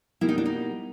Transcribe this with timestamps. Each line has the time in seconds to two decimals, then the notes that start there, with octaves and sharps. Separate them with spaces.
0.21 B2 G3 A#3 E4
0.29 D#4
0.38 D4
0.46 D#4